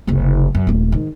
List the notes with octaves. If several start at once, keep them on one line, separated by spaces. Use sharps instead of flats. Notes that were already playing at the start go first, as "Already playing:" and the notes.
F#1 C2
F#2
D#1 A3
G#2 D#3